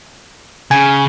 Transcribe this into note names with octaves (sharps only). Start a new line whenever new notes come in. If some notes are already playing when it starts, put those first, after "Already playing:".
C#3 G#5